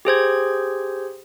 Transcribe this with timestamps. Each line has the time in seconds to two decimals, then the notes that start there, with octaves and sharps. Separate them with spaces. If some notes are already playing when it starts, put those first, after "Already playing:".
0.05 G4 G#4 C5 G#6